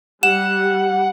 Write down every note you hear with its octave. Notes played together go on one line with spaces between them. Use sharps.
G3 F#5 E7